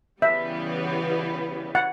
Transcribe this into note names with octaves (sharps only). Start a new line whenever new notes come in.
C#3 E3 G3 B3 E5
F#5